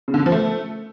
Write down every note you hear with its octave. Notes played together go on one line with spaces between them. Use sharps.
C#3
D3
C#3
F3
A3